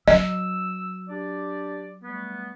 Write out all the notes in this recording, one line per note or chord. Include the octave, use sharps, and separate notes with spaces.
F#3 D#5 E6
D4 G4 D5
G3 A3 B3